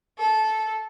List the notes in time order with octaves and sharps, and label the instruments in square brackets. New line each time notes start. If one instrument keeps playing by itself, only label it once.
[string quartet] A4